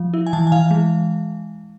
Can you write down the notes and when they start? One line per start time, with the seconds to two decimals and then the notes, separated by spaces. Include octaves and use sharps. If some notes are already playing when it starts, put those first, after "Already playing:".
Already playing: F3
0.14 E4
0.27 G#5
0.33 E3 A5
0.47 G#5
0.52 E3 F5
0.71 G#3